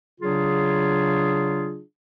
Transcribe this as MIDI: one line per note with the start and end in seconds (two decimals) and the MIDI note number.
0.21 1.81 49
0.21 1.81 54
0.21 1.81 62
0.21 1.81 65
0.21 1.81 68